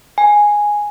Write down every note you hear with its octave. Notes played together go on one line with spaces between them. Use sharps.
G#5